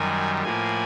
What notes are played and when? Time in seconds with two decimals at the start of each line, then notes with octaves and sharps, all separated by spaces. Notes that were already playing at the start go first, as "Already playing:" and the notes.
Already playing: F#2 D#3 G3 G#5
0.43 A2 F3 A#3 G#5